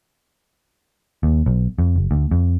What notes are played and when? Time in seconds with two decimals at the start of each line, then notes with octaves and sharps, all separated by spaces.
1.23 D#2
1.46 B1
1.79 F2
1.96 F#1
2.11 D2
2.31 F2